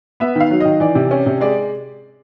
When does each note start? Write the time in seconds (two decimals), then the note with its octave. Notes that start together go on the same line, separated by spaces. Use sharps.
0.20 B3 E5
0.35 D#3
0.40 F5
0.51 F#3
0.60 D#3 D#5
0.80 E3 D5
0.95 C3
1.11 C#4
1.26 C3
1.41 G#3 D5